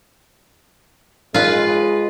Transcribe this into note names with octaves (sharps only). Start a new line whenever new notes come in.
G#3 F4 B4